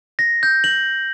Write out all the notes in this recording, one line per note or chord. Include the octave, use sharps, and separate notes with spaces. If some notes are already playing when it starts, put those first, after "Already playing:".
A#6
G6
F#7